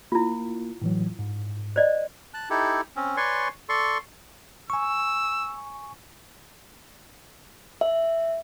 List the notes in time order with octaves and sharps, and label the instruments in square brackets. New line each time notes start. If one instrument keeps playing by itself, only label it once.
[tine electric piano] A#3 [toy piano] E4 F4
[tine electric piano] A2 E3 F#3
G#2
[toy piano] C5 D5 D#5
[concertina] A5 F#6
D#4 E4 G4 A4
C4 C#4
B4 C#5 D5 G#5 C6 C#6
A4 D5 C6 C#6
[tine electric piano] G#5 C#6 [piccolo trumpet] E6
[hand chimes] E5